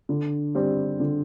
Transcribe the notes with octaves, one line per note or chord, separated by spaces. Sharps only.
D3
G3 C4 G4 D5
D3